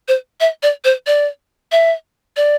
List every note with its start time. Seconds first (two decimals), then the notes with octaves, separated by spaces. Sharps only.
0.08 C5
0.41 E5
0.63 D5
0.84 C5
1.07 D5
1.72 E5
2.37 D5